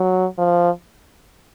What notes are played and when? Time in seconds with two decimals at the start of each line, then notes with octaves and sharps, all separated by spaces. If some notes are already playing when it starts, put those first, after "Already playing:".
Already playing: F#3
0.38 F3